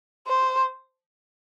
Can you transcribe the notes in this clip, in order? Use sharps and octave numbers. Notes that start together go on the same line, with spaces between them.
C5